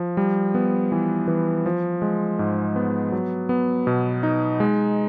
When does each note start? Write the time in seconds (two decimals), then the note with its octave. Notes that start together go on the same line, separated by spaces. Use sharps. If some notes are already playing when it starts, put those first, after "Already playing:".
Already playing: F3
0.17 G3
0.55 B3
0.92 E3
1.28 E3
1.66 F3
2.02 G#3
2.39 G#2
2.76 B3
3.12 F#3
3.49 B3
3.87 B2
4.23 D#4
4.60 G#3